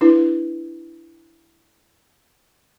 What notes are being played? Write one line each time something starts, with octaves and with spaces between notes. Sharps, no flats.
D4 E4 B4